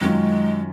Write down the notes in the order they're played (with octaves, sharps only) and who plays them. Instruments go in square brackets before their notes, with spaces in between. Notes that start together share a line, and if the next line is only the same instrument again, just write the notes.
[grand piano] F#2 D#3 F#3 C#4 F4 [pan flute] G#3